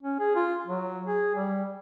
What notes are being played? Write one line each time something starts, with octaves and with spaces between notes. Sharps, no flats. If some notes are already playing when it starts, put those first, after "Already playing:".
C#4
G#4
F4
F#3
G#4
G3